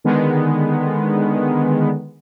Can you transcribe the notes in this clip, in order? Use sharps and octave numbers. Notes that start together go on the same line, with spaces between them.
D3 D#3 G#3 B3